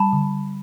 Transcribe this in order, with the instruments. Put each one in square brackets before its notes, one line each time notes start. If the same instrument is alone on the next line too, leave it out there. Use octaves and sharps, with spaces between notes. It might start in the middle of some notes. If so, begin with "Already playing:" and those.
Already playing: [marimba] G3 [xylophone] A5 B5
[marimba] D3